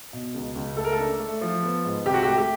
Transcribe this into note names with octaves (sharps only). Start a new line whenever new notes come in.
B2
C#2
C#2
A3 A4
A#4
A4
D4
A3
F3
B3
G#2
C2 G4
F#4
A3 G4
G4